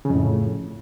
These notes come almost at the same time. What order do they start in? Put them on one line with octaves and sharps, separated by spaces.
C#3 F2 A2